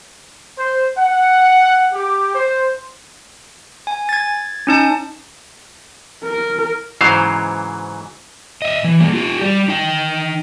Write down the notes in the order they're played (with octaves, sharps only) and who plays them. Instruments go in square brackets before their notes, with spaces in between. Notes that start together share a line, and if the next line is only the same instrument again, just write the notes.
[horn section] C5
F#5
G4
C5
[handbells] G#5
G#6 A6
C#4 D#4 A5
[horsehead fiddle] A#4
[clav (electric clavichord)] G#2 C#3 E3 F#3 C5 F5
[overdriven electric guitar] D#5 E5
E3
G3 A#3
F4 G4
G3 G4
D#4 G5